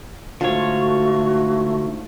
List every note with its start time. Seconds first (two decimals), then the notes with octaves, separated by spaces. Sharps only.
0.41 G#2 D3 A3 F4 F#4 C#5